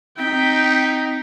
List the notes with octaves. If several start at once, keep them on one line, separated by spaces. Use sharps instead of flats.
C4 D#4 G5 B6